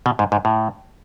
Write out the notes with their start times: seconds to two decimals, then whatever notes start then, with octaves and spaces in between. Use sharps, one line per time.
0.06 B2
0.19 G#2
0.32 G#2
0.45 A2